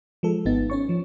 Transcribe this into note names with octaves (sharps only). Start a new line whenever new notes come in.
F3 G#3 A4
G#1 B3 D#4 A6
C#4 C#5 C#6
F3